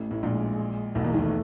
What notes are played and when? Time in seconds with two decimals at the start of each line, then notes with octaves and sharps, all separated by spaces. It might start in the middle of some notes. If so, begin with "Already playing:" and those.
Already playing: A1 A2 A3
0.11 A1 A2
0.23 A#1 A#2 G#3
0.95 B1 B2 A3
1.04 E2 E3 A#3
1.13 D#2 D#3 G#3
1.22 E3 A3